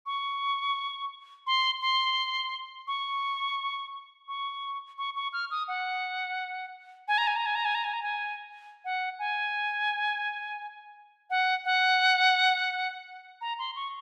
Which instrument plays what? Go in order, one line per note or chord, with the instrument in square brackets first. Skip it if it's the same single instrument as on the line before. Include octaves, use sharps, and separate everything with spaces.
[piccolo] C#6
C6
C6
C#6
C#6
C#6
C#6
F6
D#6
F#5
G#5
A#5
G#5
A#5
G#5
A#5
G#5
A#5
G#5
A#5
G#5
F#5
G#5
F#5
F#5
A#5
C6
C#6